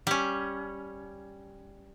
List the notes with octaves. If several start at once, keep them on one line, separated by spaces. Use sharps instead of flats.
G3 C#4